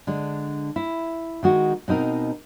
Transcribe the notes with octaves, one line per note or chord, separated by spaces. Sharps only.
D3 G#3 D4
E4
D#3 G#3 F#4
B2 C4 D#4 A#4